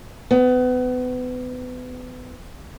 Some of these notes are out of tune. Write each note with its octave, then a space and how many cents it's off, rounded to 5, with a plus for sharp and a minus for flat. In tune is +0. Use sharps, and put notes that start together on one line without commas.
B3 +30